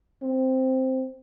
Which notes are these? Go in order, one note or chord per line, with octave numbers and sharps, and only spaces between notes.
C4